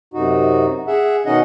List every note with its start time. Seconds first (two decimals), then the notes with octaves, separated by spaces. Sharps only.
0.14 F#2 C3 D#4 F#4
0.87 G#4 E5 F#5
1.26 B2 D#3 C#4 D#4 D#5 F#5